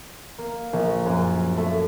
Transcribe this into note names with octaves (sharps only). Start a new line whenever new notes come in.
A#3
A#1
F#2
A3